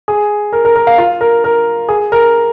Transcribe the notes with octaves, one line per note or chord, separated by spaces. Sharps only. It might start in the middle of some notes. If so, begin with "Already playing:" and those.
G#4
A#4
A#4
A#4
F5
F4
A#4
A#4
G#4
A#4